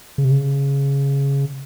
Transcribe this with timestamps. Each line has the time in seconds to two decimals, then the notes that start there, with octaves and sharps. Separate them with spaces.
0.18 C#3
0.24 C3
0.31 C#3